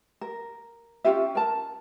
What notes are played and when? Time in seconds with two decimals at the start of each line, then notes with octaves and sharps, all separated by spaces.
0.21 A#4
1.04 C#4 F4 G4 E5
1.35 A#4 A5